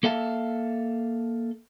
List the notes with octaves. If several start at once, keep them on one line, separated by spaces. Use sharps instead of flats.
A#3 A4 E5 F5 A5